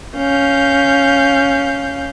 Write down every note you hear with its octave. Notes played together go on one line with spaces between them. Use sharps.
C#4 F5 G6